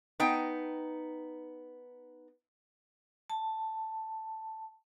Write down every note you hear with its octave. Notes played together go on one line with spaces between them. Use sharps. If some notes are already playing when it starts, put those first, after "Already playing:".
B3 D#4 G5
A5